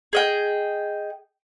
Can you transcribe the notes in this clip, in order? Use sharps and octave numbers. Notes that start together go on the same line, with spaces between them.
G#4 D#5 G5